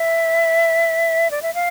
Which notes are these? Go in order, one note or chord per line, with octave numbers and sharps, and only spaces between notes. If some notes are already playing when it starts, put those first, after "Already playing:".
Already playing: E5
D5
E5
F5